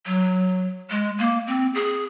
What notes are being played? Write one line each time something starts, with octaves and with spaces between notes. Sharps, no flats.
F#3
G#3
A#3
C4
G#4